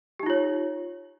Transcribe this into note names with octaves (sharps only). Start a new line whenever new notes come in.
D#4 F4 G4 C#5